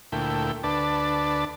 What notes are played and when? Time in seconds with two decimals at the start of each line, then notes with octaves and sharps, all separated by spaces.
0.12 D2 A#2 A3 E4 G5
0.63 D2 D4 B4 D5 A5